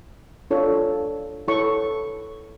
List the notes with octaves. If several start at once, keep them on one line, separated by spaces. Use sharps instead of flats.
D4 F4 A4 C#5
E4 A4 C#5 C#6